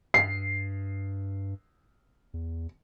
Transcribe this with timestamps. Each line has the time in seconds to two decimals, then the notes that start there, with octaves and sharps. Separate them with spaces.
0.14 G2 C7
2.34 E2